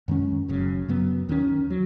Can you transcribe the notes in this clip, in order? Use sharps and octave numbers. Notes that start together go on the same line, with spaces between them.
F#2 D#3 G#3 C#4
F#1 F#2 C#3
F#2 C#3 F#3 B3
D#2 D#3 F#3 C#4
F#3